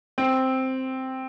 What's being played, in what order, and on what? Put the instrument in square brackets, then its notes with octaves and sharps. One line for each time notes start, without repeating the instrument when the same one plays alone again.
[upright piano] C4